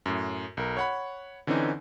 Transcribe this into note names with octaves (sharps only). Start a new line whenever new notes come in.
F#2 A2
B1 A#4
C#5 F#5 B5
D3 E3 C4 C#4 D#4